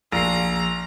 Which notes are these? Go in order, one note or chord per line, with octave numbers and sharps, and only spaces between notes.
A#1 A#5 C7